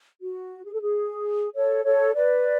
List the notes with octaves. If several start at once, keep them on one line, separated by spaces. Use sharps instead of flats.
F#4
G#4
A4
G#4
A4 C#5
A4 C#5
B4 D5